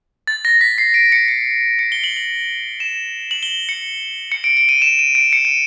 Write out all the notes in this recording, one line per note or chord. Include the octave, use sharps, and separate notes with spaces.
A6
A#6
B6
C7
D7
C#7
C#7
C#7
G7
F#7
F#7
E7
F#7
G7
C#7
C#7
D7
D7
D#7
E7
D#7
D7
C#7
D#7